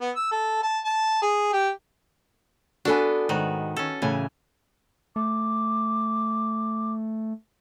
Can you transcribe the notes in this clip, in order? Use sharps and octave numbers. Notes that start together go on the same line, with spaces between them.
B3
E6
A4
A5
A5
G#4
G4
B3 D4 F#4 A4 G#5
G#2 D#3 F#4
C#4 A4
A2 C#3 E3 G#5
A3 D6